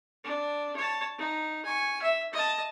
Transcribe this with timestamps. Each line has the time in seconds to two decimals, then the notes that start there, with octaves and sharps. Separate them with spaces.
0.24 D4
0.76 C#5 A5
1.18 D#4
1.65 G#5 C#6
2.02 E5
2.33 D#5 A5